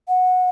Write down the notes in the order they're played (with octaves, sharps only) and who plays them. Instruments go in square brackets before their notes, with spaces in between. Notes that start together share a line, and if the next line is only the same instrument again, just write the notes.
[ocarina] F#5